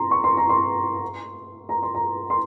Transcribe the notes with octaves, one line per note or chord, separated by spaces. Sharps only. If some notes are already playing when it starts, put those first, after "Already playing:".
Already playing: A#5 C6
C#6
C6
A#5
C6
A#5
C6
A#5
C6